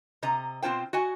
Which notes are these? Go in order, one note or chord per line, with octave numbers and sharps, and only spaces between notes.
C3 D#5 A#5
B2 C4 F4 C5 G5
F#4 D#5 G#5